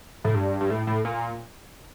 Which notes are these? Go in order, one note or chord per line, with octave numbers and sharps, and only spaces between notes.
A2
G2
G2
A2
A2
A#2